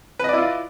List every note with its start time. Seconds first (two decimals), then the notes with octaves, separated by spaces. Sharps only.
0.19 B4
0.24 D#5
0.29 D5
0.33 E4
0.38 F4